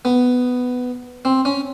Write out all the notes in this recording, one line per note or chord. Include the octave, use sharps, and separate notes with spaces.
B3
C4
C#4